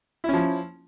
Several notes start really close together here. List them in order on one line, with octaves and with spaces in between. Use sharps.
E4 C#4 F3